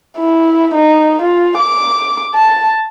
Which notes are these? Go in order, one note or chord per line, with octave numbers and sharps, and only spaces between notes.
E4
D#4
F4
D6
A5